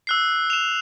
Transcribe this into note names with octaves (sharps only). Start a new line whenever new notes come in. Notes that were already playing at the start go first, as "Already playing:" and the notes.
E6 F#6 C7
E7 F7